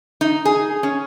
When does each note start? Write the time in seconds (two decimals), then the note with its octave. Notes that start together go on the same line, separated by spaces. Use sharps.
0.21 D#4
0.45 G#4
0.83 C#4